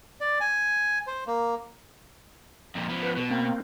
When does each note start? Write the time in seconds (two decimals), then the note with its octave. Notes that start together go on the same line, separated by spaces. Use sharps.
0.21 D5
0.41 G#5
1.07 C5
1.27 A#3
2.75 F2 A#2
2.89 F3 B3
3.03 B4
3.17 B2
3.30 A#3 C4